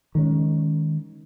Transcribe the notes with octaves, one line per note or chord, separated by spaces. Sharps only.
D#3 G#3 C#4